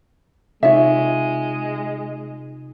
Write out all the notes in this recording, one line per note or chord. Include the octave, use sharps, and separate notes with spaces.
C3 G#3 D#4 F4 C#5 E5